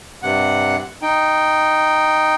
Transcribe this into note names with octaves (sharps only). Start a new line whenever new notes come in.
G2 C3 F#5
D#4 G5